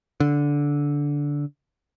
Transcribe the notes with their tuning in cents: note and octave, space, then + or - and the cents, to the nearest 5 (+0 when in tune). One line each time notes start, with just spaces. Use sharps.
D3 -15